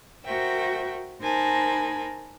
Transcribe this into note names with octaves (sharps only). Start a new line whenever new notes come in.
F#4 A#4 C5 E5 G5
D#4 A#4 C5 G#5 A5 B5